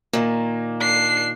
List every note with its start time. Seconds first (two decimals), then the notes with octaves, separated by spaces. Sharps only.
0.13 A#2 D#3 A#3
0.81 D4 C7